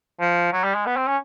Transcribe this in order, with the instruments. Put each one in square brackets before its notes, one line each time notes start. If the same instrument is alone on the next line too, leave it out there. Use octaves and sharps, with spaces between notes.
[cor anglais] F3
F#3
G3
G#3
B3
C4
C#4